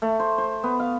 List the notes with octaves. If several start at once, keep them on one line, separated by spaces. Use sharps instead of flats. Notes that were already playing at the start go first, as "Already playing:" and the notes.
A3
C5
C5
B3
F5